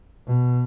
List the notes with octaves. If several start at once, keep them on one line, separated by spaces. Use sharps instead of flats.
B2